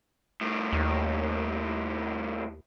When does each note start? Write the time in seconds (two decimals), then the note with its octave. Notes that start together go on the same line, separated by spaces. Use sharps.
0.41 C2 A2
0.73 D#2